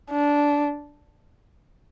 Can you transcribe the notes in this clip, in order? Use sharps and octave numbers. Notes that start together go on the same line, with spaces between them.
D4